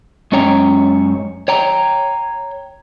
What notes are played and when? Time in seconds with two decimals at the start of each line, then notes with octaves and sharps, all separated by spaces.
0.32 F#2 G#3 C#4 C#5 G5 A#5
1.48 C#5 G5 A#5